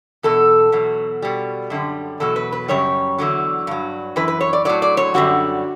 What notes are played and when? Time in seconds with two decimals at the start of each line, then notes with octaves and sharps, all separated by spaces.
0.23 E2 B2 A4
0.72 E2 B2 F#3
1.22 B2 G3
1.70 F#2 D3 G3
2.20 E2 B2 F#3 A4
2.36 B4
2.52 B4
2.68 F#2 C#3 G3 C#5
3.18 E2 D3 F#3
3.67 G2 F#3
4.16 F#2 E3 B4
4.28 B4
4.41 C#5
4.53 D5
4.65 A2 F#3 D5
4.82 D5
4.97 C#5
5.14 F#2 D3 G3 F#4